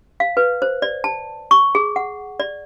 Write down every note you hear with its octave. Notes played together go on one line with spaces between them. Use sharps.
F5
B4
C5
D5
A5
C#6
G#4
F#5
D5